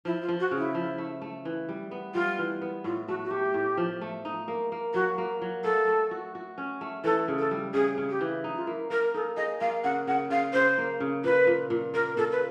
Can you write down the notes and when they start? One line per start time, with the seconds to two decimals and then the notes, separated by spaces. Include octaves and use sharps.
0.05 F3 E4
0.22 F4
0.29 F3
0.40 F#4
0.51 C#3
0.57 E4
0.75 F3
0.98 A3
1.22 A3
1.45 E3
1.69 G3
1.91 B3
2.14 G3 F4
2.39 E3
2.62 B3
2.84 A2 F4
3.08 A3 F#4
3.24 F#4
3.31 A3 G4
3.54 A2
3.77 F3
4.01 A3
4.25 D#4
4.48 A#3
4.72 A#3
4.94 F#3 F#4
5.18 A#3
5.42 F#3
5.64 A3 A4
5.87 A3
6.11 F#4
6.35 F#4
6.58 C#4
6.81 A3
7.04 E3 A4
7.28 C#3
7.39 A4
7.51 G3
7.74 C#3 G#4
7.98 C#3
8.10 G4
8.21 E3
8.44 D#4
8.56 F4
8.67 A#3 E4
8.90 A#3 A#4
9.14 D#4 A4
9.37 G#4 D#5
9.61 A#3 F5
9.84 C#3 F#5
10.07 C#3 F#5
10.30 C#3 F5
10.53 C#3 C5
10.78 A#3
11.00 C#3
11.24 A#2 B4
11.47 A#2
11.70 A#2
11.94 A#3 A#4
12.17 A#2 A4
12.32 B4